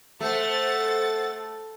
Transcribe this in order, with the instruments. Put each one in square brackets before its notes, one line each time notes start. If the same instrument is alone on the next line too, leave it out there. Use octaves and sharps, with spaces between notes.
[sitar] A3 [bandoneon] A4 [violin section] C5 F#5 A6